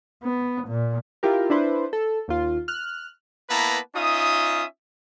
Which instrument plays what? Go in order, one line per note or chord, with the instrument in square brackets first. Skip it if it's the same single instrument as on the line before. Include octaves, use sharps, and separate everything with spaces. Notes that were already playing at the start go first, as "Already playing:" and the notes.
[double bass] B3
A#2
[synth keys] E4 F4 G4 A#4
D4 E4 B4 C5
A4
D#2 F4
F6 F#6
[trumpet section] A#3 B3 E4 B4 A5 A#5
C#4 D#4 F4 E5 D#6